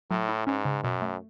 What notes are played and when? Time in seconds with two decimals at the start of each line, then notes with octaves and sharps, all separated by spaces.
0.10 A2 F#3
0.29 E4
0.47 G#2 C#4
0.65 C#3
0.84 F#2 B2
1.02 A3